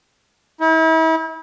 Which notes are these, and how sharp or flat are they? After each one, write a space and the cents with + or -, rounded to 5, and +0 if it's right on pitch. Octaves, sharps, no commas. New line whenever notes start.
E4 -40